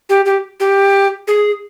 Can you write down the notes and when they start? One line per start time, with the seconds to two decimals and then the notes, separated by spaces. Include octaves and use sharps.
0.09 G4
0.25 G4
0.60 G4
1.28 G#4